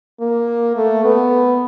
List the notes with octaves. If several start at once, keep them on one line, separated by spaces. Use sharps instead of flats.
A#3
A3
B3